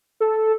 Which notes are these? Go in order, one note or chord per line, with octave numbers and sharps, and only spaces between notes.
A4